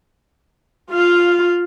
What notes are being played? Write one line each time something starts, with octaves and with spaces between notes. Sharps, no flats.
F4 F5